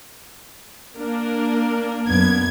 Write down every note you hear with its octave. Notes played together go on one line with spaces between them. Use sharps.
A#3 D4 A#4
F#2 B3 G#6